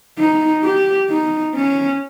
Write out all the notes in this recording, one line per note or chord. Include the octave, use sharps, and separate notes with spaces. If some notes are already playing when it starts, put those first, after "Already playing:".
D#4
G4
D#4
C#4